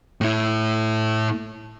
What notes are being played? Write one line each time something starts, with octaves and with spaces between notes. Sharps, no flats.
A2 E4